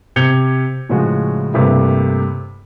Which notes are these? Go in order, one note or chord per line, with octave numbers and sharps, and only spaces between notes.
C3 G6 G#6 C#7 F7 G7
A2 C#3 F3 G#3 F#4
G2 C3 A3 A#3 E4